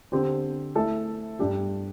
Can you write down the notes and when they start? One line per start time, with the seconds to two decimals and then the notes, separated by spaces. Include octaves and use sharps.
0.12 D3 C4 G4 C5
0.75 A3 E4 A4 E5
1.39 G2 G3 D4 G4